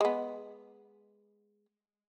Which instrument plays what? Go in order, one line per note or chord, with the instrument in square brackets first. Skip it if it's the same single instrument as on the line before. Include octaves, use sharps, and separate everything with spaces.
[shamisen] G#3 B3